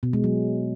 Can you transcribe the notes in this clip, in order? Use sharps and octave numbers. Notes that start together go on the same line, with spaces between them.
B2
G#3
F#3